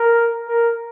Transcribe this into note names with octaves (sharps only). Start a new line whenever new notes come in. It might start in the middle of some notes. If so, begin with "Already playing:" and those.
Already playing: A#4
A#4